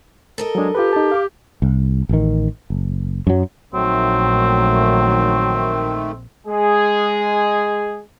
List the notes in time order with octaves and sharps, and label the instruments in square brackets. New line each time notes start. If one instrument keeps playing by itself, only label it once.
[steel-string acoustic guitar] A4 A#4 D#5
[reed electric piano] F#3 D4 [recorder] G#3
[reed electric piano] F4 B4 [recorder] G4
[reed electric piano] D#4 A5
F5 D6
[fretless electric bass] C2
A1 D#3
F#1
F#2 F#3
[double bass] A#1 [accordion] D#3 A3 [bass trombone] F#3 [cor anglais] C4
[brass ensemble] G#3 G#4